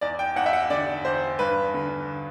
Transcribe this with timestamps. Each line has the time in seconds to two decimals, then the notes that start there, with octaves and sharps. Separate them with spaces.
0.01 E2 D5
0.19 G5
0.36 E2 F#5
0.46 E5
0.53 F#5
0.70 D3 D5
1.05 E2 C5
1.39 G2 B4
1.74 D3